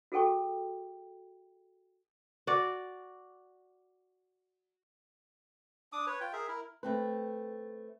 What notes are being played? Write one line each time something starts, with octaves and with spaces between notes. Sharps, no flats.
F#4 G#4 A4 G5 C#6
F#4 D5
D4 D6 D#6
B4 C#5
F4 G5
G#4 A#4 E5
E4 A#4
A3 C4 B4